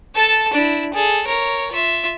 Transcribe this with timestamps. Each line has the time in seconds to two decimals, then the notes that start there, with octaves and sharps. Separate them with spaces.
0.15 A4 A5
0.53 D4 E4
0.94 G#4 A4
1.27 A#4 C#5
1.72 F4 E5